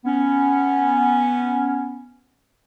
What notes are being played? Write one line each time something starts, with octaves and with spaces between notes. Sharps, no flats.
B3 C#4